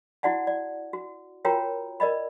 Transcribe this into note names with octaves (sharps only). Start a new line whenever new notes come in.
E4 F#4 D5 F#5 A5
D5
F#4
F4 F#4 A#4 C#5 G5 A#5
A#4 D5 D#5 B5